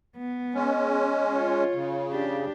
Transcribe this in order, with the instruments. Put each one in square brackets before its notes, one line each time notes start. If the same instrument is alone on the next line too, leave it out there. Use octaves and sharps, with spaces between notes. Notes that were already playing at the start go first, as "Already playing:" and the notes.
[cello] B3
[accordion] G#3 C#4
[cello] F4 C#5
[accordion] C#3
[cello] D4 G4